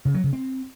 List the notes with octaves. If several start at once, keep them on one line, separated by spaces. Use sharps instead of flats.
C#3
F#3
C#3
C4